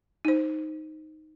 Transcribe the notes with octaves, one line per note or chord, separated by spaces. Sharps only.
D#4 C5